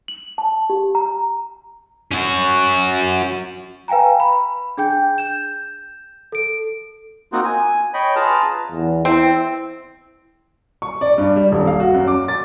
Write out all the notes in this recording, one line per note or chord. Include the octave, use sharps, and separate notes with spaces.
F#7
A5
G4
A#5
C#4 F#4
B4 F5 G5 G#5 A#5
B5
D4 G#4 G5 G6
G6 E7
A4 D7
A#3 C4 D#4 F4 F#4
G#5
C#5 D#5 G5 B5
F4 G#4 B4 A5 A#5 F6
E2
C4 E4
C#6
D5
G2
G3
D#1
F5
F#4
F#2
D6
A6